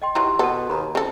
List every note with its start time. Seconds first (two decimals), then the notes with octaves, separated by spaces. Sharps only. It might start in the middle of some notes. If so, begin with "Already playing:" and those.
0.02 D#5 G5 C6
0.15 D#3 E3 F#3 G4 A5 C6
0.39 B2 A4 F#5 A5
0.70 D#2 A#5 B5
0.95 F2 C#3 A4